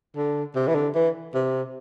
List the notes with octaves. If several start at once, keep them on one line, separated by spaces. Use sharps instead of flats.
D3
C3
E3
D3
E3
C3